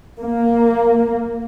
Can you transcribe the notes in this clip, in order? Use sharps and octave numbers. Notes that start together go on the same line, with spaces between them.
A#3